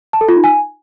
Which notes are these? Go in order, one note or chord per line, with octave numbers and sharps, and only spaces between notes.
A5
A4
F4
D#4
G#5